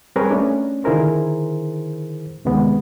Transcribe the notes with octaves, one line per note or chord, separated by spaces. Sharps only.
G3 C4 G#4 A#4 B4 C#5
A3 C#4 D4
D3 D#3 E4 G#4 A#4 C5
D2 C3 D#3 G#3 B3